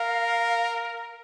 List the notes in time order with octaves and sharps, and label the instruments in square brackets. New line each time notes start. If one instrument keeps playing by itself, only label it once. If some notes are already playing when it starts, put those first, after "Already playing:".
Already playing: [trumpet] A#4 [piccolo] F5